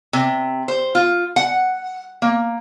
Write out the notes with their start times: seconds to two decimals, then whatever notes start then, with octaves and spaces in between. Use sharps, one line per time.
0.13 C3
0.68 C5
0.95 F4
1.36 F#5
2.22 A#3